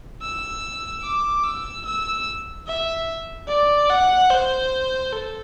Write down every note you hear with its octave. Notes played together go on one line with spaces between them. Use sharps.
E6
D6
E6
E6
E5
D5
F#5
C5
A4